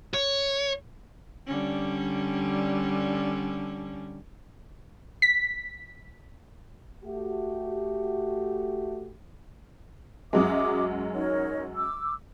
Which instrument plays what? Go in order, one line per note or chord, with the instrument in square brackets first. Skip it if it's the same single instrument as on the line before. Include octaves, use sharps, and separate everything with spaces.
[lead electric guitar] C#5
[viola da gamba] D3 G3 C#4
[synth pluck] B6
[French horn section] A3 F#4 G4
[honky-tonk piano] F#2 F#3 G#3 [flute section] E5 D6 D#6
[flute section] D#4 A#4 C#5
D6 E6